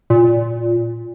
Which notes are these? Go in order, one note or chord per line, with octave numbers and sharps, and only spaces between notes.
A#2